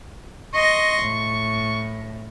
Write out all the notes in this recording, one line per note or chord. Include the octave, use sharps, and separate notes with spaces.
D#5 C6 C#6 A#6
A2